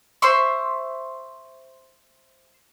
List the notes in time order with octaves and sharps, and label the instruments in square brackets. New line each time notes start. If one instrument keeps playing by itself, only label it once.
[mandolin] C5 E5 C6 C#6